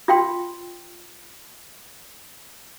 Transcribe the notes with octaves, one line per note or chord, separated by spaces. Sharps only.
F4 F5 G5 C6